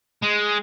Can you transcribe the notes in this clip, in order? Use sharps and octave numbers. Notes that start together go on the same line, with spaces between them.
G#3